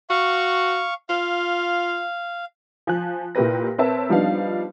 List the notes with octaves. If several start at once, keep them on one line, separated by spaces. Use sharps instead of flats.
F#4 F5 C#6
F4 F5
F3 G#5 F#6
A#2 E4 G4 A#4 B4 A#6
C4 A#4 B4 C#5 E5 A5
F3 G3 B3 D4 D#4 F5